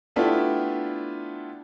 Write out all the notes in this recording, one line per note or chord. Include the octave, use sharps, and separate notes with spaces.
A3 B3 D4 E4 F4 G4